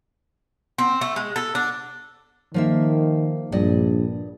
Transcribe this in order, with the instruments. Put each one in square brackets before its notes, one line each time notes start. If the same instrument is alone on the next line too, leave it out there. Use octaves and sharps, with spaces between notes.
[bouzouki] C4
A3
G#3
A4
D4
[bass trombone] D#3 [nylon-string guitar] F3 A#3 E5
[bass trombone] A#1 [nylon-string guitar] G2 D5 D#5